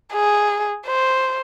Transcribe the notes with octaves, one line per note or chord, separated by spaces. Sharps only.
G#4
C5